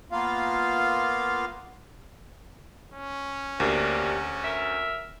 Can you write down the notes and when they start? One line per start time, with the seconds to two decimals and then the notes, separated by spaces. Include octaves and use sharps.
0.12 A#3 B3 F4 F5
2.94 C#4
3.60 D2 G2 C3 A#3
4.44 A#4 E5